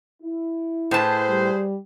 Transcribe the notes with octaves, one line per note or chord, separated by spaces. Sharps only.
E4
A2 G#4 B4 C5 A5
G3